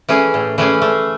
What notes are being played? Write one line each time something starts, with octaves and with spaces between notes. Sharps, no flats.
E3 A3 C#4 G#4
A2
E3 A3 C#4 G#4
A3